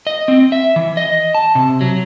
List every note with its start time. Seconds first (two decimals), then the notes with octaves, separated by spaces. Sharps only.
0.07 D#5
0.28 C4
0.52 E5
0.76 E3
0.97 D#5
1.35 A5
1.55 C3
1.81 F#3